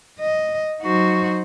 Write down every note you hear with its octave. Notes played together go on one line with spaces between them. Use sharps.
D#5
F#3 D#4 F#4 C5